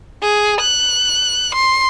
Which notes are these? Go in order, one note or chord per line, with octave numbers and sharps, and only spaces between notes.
G#4
F#6
C6